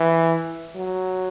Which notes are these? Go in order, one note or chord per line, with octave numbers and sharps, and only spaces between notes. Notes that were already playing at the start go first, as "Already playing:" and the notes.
Already playing: E3
F#3